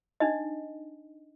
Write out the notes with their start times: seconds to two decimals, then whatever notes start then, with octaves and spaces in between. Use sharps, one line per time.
0.20 D4 D#4 D#5